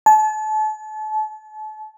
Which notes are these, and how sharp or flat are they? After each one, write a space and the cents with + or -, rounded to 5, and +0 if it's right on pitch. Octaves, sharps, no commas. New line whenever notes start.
A5 -35